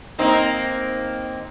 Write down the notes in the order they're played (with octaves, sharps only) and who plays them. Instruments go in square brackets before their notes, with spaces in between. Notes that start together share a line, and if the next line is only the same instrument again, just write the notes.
[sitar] A#3 C4 D#4